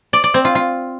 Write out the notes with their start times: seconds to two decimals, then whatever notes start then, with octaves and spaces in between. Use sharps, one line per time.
0.13 D5
0.24 D5
0.34 C4
0.45 F4
0.55 F4